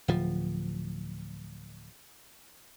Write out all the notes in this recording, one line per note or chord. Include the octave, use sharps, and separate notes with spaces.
D1 F3